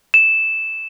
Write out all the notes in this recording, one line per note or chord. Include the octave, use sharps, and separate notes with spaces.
E7